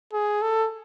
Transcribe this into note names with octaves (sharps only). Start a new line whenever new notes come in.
G#4
A4